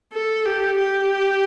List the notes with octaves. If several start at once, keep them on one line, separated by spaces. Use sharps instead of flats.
A4
G4
G4